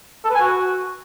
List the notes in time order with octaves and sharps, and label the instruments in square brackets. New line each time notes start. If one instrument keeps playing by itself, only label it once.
[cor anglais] A4
B4
G#5
F#4